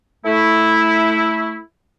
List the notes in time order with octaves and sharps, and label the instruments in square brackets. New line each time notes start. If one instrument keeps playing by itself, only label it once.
[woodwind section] A3 E4